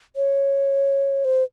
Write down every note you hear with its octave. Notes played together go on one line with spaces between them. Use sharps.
C#5
C5